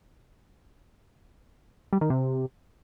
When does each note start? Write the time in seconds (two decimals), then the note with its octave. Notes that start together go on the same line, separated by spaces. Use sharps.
1.93 G3
2.01 D#3
2.10 C3